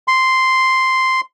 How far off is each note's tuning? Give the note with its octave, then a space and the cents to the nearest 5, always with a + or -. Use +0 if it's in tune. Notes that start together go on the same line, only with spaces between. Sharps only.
C6 -5